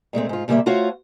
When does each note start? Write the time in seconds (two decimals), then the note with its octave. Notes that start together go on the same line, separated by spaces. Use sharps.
0.13 A#2 G#3 A3 C4
0.29 G#2 F4
0.48 A#2 C#3 G3 A3 A#3 E5
0.66 A3 F4 F#4 C5 C#5 F5